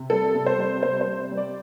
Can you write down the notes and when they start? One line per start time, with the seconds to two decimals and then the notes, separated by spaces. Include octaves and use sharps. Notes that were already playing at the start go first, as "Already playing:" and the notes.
Already playing: C3
0.10 G3 A4
0.34 C3
0.46 C5
0.58 G3
0.83 C3 C5
1.01 C5
1.07 G3
1.31 G3
1.37 D5